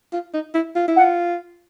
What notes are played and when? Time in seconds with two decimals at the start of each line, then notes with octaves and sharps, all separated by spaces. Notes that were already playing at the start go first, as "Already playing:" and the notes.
0.13 F4
0.34 D#4
0.54 E4
0.75 F4
0.88 E4
0.96 F#5
0.99 F4